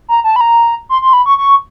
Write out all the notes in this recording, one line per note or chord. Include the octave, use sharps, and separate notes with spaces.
A#5
A5
B5
A#5
C6
C6
B5
C#6
C#6